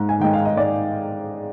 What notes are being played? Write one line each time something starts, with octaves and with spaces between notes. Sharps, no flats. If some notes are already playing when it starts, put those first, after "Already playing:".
Already playing: G#2
G#5
D#3 G#3 G5
F5
D#5
G#2 D5